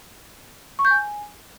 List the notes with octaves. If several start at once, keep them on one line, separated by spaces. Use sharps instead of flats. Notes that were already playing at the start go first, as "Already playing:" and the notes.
C#6
G6
G#5